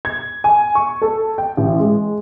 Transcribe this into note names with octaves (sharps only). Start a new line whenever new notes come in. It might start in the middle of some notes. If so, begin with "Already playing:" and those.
G#6
G#5
C#6
A4
G5
A1
G#3